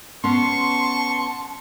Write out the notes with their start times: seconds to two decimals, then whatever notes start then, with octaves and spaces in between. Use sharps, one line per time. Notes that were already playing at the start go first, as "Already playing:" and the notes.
0.24 B3 C#4 A5 C6 C#6